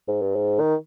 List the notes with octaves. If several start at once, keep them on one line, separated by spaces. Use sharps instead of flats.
G#2
G2
G#2
D#3